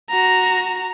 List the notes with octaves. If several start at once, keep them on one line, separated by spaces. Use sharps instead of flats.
F#4 A#5